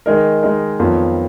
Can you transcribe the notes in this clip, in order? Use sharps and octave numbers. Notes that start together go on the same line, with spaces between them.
D#3 G#3 D#4 A#4
D#3 G#3 D#4 A#4
F2 D#3 F#3 B3 F4